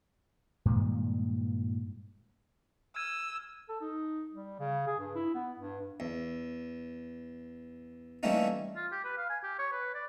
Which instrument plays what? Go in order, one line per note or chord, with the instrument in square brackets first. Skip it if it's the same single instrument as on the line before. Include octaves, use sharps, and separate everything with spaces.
[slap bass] G2 A#2 D#3 G#3
[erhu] E6 [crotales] F6 G#6 D#7
[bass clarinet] A4
D#4
G3
C#3
G#4
G2
E4
B3
G2
[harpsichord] E2
E3 G3 A3 A#3 C#4 D#4
[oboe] F4
G4
B4
F5
G#5
G4
C#5
B4
D5